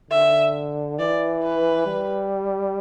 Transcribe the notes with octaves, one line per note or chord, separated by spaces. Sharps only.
D3 E5
E3 D5
B4
G3